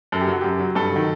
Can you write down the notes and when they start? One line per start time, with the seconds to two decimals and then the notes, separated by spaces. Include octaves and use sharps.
0.12 F#2 A4
0.21 G4
0.27 F#3 F#4
0.41 F#2 G4
0.59 F#3
0.75 G2 A4
0.92 D#3 F#3